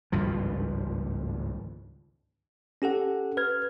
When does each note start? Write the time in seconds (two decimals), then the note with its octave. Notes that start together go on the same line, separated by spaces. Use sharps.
0.12 G#1 C#2 G2 F3
2.82 C#4 G4 A4 F#5
3.37 B4 F6 G#6